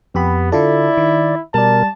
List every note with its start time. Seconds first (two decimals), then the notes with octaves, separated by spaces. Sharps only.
0.15 F2 B3 G4 B5
0.52 D3 E4 F4 A4 D5
0.97 D#3
1.54 B2 G3 A#4 D5 A5